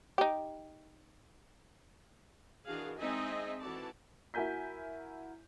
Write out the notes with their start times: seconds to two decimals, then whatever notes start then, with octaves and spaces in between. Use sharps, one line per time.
0.18 D#4 G4
2.65 D#3 E3 D4 F#4 G#4 F5
2.98 G#3 C4 D#4 D#5 E5 G#5
3.61 E3 F#4 A4 D5 A5
4.34 E4 F#4 A#4 G#5 G6 B6